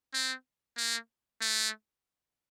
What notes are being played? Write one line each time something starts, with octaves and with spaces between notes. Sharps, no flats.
C4
A#3
A3